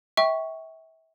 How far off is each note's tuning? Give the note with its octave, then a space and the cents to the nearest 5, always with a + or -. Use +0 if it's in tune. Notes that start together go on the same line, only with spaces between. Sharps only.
E5 -30 G5 +0 C#6 +0